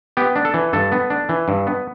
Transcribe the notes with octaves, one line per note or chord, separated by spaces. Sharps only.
B3 G4
D4
A4
E3
G2 A4
B3
D4
E3
G2
B3